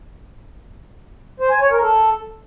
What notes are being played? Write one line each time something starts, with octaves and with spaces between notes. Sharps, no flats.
C5
G#5
C#5
A#4
A4